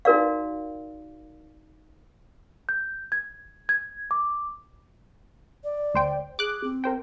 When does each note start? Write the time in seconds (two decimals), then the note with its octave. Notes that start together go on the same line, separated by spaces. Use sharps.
0.05 D#4 F#4 A#4 D5 F5
2.69 G6
3.12 G#6
3.69 G#6
4.11 D6
5.64 D5
5.94 D2 C5 G5
6.39 G#4 D6 F#6
6.64 C4
6.84 A#4 C5 G5